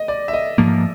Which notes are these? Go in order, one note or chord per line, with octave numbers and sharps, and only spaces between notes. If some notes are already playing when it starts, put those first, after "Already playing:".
Already playing: D#5
D5
E5
D#5
G#2 F3 A#3